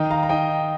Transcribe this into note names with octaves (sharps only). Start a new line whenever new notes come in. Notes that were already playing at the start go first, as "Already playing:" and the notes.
Already playing: D#3 D#4 D#5 G5
F5 A#5
A#5
D#4 D#5 G5